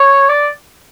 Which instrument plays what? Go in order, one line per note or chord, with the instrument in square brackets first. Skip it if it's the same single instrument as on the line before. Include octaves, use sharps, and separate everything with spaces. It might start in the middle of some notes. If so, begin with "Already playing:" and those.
Already playing: [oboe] C#5
D5